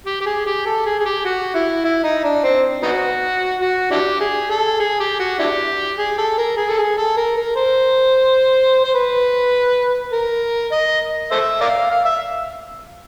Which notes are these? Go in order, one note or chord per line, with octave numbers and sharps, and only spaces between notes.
G4
G4
G#4
G4
A4
G#4
G#4
G4
F#4
E4
E4
D#4
D4
C4
B3 D#4 F#4
F#4
D4 E4 G4
G#4
A4
G#4
G4
F#4
D4 E4 G4
G#4
A4
A#4
G#4
A4
G#4
A4
A#4
A#4
C5
C5
B4
A#4
D#5
A4 C5 E5
A#4 D5 F5
F5
E5